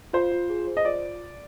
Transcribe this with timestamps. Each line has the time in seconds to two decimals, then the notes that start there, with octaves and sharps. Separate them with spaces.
0.13 F4 C5
0.32 F4
0.50 G#4
0.67 C5
0.77 D#5
0.85 F4 D5